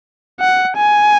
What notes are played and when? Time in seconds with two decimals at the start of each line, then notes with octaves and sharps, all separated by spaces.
0.40 F#5
0.77 G#5